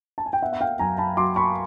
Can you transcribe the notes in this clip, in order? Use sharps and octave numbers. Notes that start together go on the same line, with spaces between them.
A5
G#5
G5
B3 E5 F#5
F#5
F5 G5
F#2 G#5 A#5
A5 B5
F#3 C6 D6
B5 C#6